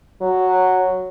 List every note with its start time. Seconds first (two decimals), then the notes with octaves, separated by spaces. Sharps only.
0.22 F#3